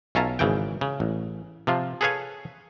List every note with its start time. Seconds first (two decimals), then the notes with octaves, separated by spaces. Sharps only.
0.15 B1 C#4 F4 E5 A5 A#5
0.39 G#1 C#3 E3 G5
0.81 C#3
1.00 A1
1.67 C3 F3 F4
2.01 G#4 A4 B4 C#5 F5 G#5